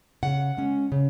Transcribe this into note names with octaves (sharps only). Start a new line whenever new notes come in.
C#3 F#5
G#3 C#4
C#3